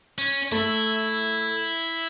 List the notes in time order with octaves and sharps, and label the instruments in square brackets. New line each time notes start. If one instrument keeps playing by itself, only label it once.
[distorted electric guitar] C#4
[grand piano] A3 [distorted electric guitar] E4